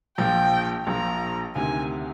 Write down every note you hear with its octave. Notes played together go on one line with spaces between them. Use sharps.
A#1 A#2 F3 G5
A#1 A#2 F3 A#5
D2 C3 D#3 G#5